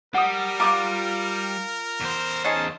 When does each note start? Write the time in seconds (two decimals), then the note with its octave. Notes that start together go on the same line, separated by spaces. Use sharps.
0.14 G3 A#4 F#5 D#6
0.60 F4 A#5 D6 D#6 F#6
2.00 E2 C5
2.44 C#4 D#4 G#4 A5